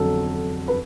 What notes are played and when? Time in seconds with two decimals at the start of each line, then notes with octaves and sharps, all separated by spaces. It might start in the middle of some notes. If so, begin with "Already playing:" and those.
Already playing: F2 D3 F#3 A4
0.68 B4